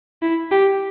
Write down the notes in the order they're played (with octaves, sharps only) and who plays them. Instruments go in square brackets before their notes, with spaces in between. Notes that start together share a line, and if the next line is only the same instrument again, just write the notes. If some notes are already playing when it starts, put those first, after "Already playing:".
[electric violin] E4
G4